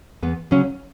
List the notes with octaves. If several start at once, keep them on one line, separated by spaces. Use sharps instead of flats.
E2 B3
C#3 F#3 C#4